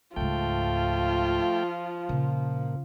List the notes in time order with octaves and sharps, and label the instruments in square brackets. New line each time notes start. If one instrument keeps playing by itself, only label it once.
[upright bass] C#2 G#2 [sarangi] F3 [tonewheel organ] A3 G5 [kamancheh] F4
[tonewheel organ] A#2 [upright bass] C#3